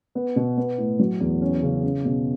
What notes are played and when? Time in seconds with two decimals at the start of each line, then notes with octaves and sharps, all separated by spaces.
0.15 B3
0.36 B2
0.57 B3
0.78 A2
0.99 F#3
1.20 E2
1.41 C#4
1.62 C#3
1.83 C#4
2.05 B2